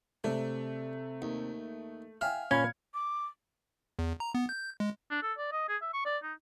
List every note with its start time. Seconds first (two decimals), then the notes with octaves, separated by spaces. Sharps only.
0.24 C3 A3 D4
1.22 D#2
2.21 E5 F5 G5 G#5 F6
2.51 A#2 C#4 F5 B5 G#6 C#7
2.94 D6
3.99 E2
4.20 A#5
4.35 B3
4.49 G6
4.80 G#3
5.10 D4
5.22 A4
5.38 D5
5.52 D#5
5.68 G#4
5.82 E5
5.93 C#6
6.05 D5
6.23 D#4